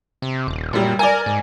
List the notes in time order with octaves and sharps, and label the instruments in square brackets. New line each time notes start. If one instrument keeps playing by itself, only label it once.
[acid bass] C3
D#1
[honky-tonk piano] F#2 G3 [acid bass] A#2
[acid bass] A#4 [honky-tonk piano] D5 G#5
[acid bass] G#2